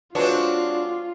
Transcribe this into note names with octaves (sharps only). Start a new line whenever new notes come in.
G#3 C4 D4 F4 F#4 B4 C#5